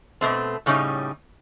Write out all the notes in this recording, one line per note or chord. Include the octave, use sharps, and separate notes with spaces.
B2 A3 C4
A2 C#3 G3 C#4 D#4